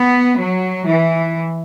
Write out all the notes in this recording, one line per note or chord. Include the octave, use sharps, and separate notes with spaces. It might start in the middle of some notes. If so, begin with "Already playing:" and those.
Already playing: B3
F#3
E3